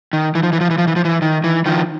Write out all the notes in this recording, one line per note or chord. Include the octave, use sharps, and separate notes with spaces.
D#3
E3
F3
E3
F3
E3
F3
E3
F3
E3
D#3
E3
D#3 F3